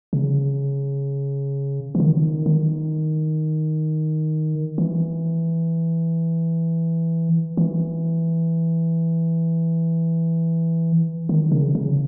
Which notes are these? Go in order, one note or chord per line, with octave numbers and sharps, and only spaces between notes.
C#3
E3
D#3
D#3
E3
E3
D#3
C#3
C#3